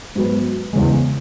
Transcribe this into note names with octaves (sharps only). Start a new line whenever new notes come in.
G#2 F#3 B3
E2 C#3 G#3